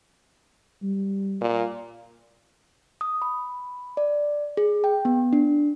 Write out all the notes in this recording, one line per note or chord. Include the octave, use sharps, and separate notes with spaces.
G3
A#2
D#6
B5
D5
G#4
G5
B3
D4